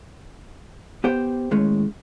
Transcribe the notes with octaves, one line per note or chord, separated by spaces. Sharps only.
B3 G4 C5 G5
D#2 A2 G#3 C#4